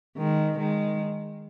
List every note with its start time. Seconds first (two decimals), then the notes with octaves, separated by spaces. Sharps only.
0.17 D#3 G#3
0.57 D#3 G#3